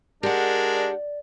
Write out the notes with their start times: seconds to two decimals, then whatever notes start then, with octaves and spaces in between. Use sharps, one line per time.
0.23 G#3 D4 G4 A#4 D5 F#5